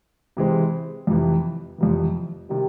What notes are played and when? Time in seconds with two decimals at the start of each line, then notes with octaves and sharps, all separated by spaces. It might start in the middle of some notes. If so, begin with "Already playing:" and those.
0.37 C3 E3 G#3 C4
1.07 F2 C3 E3
1.78 F2 C3 E3
2.49 C3 D#3 G3